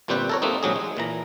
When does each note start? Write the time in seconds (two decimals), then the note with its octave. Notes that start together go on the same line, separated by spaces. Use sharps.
0.08 G1 A#2 G3 C4 G4 B4
0.29 A4 A#4 C#5
0.42 G3 A3 A#3 C4 D#4
0.63 A#1 G#2 F#3 G#4
0.76 G#3
0.97 A#2 E3 A#5